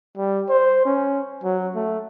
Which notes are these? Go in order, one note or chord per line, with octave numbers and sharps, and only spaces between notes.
G3
C5
C#4
F#3
A3